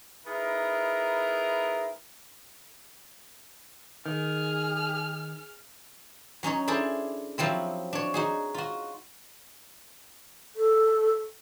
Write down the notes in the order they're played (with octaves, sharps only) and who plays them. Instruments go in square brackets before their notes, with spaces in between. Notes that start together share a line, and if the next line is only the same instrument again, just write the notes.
[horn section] B3 D#4 E4 G#4 A#4
[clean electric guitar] D#3 [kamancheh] G#4 F6
[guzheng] F#3 C#4 D#4 C#5
D4 E4 G#4 A4 C5
F3 F#3 C4 E4
D4 C#5
D#4 F#4 G#4
F4 F#4
[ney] A4